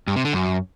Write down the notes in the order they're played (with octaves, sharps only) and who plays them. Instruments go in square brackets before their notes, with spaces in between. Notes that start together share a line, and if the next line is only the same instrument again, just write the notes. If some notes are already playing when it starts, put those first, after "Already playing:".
[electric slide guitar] G2
C3
D3
F#2